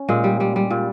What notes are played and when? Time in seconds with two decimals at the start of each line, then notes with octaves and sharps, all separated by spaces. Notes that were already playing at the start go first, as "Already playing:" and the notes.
Already playing: C#4
0.08 A#2 G#3
0.24 G3
0.40 G3
0.56 G3
0.70 A#2